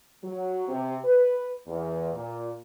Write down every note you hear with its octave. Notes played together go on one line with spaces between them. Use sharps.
F#3
C3
B4
E2
A#2